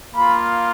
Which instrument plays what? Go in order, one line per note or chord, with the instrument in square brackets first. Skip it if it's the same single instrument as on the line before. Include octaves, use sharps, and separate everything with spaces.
[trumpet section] A#3 F4 B5